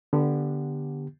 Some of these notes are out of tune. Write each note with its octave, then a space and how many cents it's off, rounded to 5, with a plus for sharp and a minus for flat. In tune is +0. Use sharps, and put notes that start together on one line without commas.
D3 +0 B3 -25 G4 +0